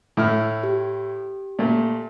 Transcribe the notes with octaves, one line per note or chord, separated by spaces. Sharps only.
A2 E4 F6
G4
A#2 A3